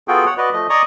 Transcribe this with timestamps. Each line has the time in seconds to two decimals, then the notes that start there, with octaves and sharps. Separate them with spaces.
0.08 B3 F4 F#4 G#4 A4 G5
0.26 C#5 F#5
0.38 F#4 B4 D5 D#5
0.53 F3 A3 D#5
0.70 D5 D#5 G#5 A#5 C#6 D#6